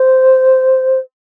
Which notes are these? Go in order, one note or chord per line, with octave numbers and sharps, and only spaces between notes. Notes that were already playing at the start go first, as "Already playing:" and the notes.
Already playing: C5